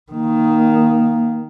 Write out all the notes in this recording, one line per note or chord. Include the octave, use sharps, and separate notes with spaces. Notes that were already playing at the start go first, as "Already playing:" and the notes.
D#3 A#3